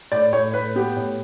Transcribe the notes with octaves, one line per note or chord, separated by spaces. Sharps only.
A2 D5
A2 C#5
A2 B4
B3 G4
A2